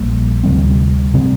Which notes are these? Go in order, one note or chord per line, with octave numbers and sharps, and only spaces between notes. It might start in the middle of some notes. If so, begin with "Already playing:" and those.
Already playing: A#1 A#2 G3 A#3
D2 C3 G3 C4
C3 G3 C4